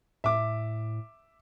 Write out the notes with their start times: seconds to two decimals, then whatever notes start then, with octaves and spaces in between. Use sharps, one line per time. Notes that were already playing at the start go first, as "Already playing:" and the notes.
0.24 A2 E5 D6